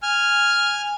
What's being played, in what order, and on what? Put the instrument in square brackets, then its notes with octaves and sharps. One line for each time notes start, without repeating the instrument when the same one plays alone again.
[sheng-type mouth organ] G#5 F6